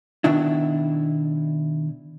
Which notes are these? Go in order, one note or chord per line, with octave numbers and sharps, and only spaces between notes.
B2 D#3 D4 E4